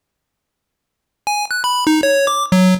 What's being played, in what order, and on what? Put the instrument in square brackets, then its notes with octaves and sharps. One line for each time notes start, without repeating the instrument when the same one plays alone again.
[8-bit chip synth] G#5
F#6
B5
D#4
C#5
D6
F#3